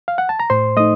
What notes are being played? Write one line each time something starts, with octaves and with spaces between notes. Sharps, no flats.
F5
F#5
A5
A#5
A2 C5 C6
A3 D#4 D#5 D#6